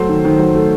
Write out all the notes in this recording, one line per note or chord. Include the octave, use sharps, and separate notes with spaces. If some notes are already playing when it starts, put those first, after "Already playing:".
Already playing: F#3 A3 C5
D#3
D#3
F#3
A3